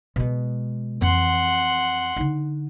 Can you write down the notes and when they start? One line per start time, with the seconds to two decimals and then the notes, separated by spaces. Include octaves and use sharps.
0.16 B2 G#3
1.02 F2 E3 F#5 C6
2.16 D3 D#4